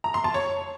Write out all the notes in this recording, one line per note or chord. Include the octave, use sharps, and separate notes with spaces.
A#5
C6
A5
C#5